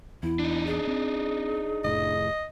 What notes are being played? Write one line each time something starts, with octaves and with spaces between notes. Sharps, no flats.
E2 E4
D4 D#4
G#4
C4
F1 A2 D#5